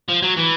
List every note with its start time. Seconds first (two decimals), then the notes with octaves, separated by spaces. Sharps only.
0.09 F3
0.23 F#3
0.37 E3